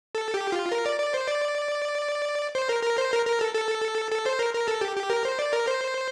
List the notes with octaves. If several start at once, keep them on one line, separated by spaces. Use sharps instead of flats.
A4
G4
F4
A#4
D5
D5
C5
D5
C5
A#4
A#4
C5
A#4
A#4
A4
A4
A4
C5
A#4
A#4
A4
G4
G4
A#4
C5
D5
A#4
C5